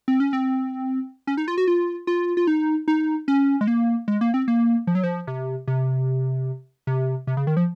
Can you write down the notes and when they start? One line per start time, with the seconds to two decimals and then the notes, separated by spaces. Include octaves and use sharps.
0.08 C4
0.20 C#4
0.33 C4
1.27 C#4
1.37 D#4
1.48 F4
1.58 F#4
1.68 F4
2.07 F4
2.37 F4
2.47 D#4
2.88 D#4
3.28 C#4
3.61 G#3
3.67 A#3
4.08 G#3
4.21 A#3
4.34 C4
4.48 A#3
4.87 F3
4.95 F#3
5.03 F3
5.27 C3
5.68 C3
6.87 C3
7.27 C3
7.37 C#3
7.47 D#3
7.57 F3